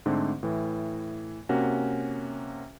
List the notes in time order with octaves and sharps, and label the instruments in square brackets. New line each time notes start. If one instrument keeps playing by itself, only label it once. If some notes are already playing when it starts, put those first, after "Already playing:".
[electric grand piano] G#2 D3 A3 C4
A2 E3
C3 A#3 C#4 F#4